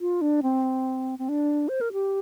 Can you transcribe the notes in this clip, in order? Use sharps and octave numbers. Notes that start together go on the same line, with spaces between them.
F4
D4
C4
C4
D4
C5
A#4
G4